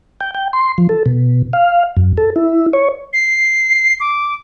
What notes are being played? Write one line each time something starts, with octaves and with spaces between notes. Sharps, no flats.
G5
G5
C6
F3
A4
B2
F5
F#2
A4
E4
C#5
C7
D6